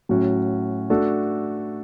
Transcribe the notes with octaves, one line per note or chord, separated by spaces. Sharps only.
A2 F#3 C#4 F#4
A3 D4 F#4 A4